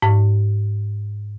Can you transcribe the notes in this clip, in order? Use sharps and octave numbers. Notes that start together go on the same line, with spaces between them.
G#2